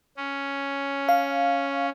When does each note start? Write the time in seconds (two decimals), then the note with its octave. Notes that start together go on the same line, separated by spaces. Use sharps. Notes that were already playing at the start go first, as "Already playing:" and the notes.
0.17 C#4
1.09 F5